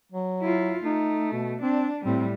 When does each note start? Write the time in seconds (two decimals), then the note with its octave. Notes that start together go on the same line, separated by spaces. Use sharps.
0.12 F#3
0.41 E4 F4
0.85 A3 D#4
1.32 B2
1.62 C4 D4
2.05 A2 G3 C4